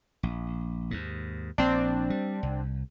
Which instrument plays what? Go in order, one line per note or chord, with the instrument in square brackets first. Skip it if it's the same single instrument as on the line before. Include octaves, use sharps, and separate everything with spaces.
[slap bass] A#1
D#2 G#2
[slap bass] A#1 [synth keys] C4 D4
[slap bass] G3
C2